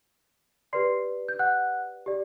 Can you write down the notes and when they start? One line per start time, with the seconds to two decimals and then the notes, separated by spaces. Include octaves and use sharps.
0.73 G4 B4 D5 C6 C7
1.28 G6
1.39 F#5 F#6
2.06 G4 D5